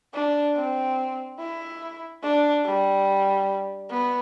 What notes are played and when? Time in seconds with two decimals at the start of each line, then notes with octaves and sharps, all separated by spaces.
0.14 D4
0.56 C4
1.39 E4
2.23 D4
2.65 G3
3.91 B3